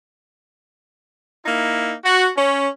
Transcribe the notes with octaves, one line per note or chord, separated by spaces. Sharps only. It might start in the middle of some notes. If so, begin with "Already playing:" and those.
A#3 D#4 E4
F#4
C#4